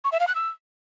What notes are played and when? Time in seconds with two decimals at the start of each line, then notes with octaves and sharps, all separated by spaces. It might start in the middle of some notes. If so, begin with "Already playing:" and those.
0.04 C#6
0.12 E5
0.20 F5
0.27 F#6
0.35 E6